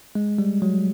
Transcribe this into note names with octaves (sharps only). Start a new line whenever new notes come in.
G#3
G3
F#3